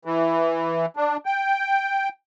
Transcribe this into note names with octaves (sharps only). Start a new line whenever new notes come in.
E3
D4
G5